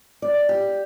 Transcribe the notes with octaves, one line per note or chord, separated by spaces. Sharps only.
D5
G4